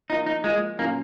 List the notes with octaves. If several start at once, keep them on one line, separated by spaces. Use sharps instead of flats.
F3 A#3 D#4 F4
D#4
F3 G#3 A#3 F4
A#2 F#3 A#3 C#4